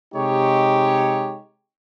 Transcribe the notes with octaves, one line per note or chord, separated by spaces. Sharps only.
C3 G#3 D#4 G4 C#5